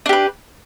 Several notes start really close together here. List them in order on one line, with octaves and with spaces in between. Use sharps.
D4 G4 B4